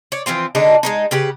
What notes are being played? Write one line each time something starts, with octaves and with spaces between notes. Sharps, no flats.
C#5 D5
E3 F3 C4 F4
D3 G#3 D4 D#4
G#3 B3 D#4
C#3 G4 B4